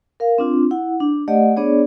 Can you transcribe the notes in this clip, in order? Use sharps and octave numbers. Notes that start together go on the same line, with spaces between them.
A#4 F5
C4 D4 F4
E4 F#5
D4
A3 G4 D5 D#5 F#5
B3 D4 G#4 C#5 D5